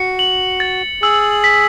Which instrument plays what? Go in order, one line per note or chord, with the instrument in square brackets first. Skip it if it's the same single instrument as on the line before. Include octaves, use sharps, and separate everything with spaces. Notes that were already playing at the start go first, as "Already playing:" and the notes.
Already playing: [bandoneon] F#4 [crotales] C#7
[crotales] F#7
A6
[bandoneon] G#4 [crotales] E6
[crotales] B6